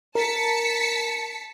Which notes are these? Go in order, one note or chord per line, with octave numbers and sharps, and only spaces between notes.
A#4 A5 B6 C#7